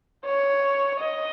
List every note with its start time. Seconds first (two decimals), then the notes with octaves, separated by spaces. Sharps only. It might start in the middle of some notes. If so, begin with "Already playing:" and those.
0.25 C#5
1.00 D#5